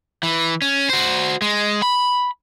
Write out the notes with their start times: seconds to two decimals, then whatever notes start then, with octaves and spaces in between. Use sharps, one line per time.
0.23 E3
0.62 C#4
0.90 F#4 C5
1.42 G#3
1.82 B5